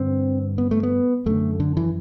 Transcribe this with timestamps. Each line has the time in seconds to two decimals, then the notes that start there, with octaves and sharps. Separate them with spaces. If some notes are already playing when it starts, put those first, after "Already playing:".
Already playing: G2 D3 C4
0.58 B3
0.71 A3
0.83 B3
1.26 F#2 D3 A3
1.60 D3
1.77 E3